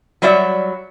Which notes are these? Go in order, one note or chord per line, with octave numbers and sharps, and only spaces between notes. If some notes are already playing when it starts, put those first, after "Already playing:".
F#3 G3 F#4 D5 E5